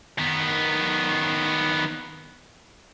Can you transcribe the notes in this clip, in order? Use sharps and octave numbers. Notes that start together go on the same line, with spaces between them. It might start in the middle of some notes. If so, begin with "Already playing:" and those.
D#3 B3